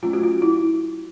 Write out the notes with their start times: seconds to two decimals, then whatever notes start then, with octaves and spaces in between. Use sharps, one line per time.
0.03 F#3 A3 C#4 F4
0.13 F#4
0.23 F4
0.42 E4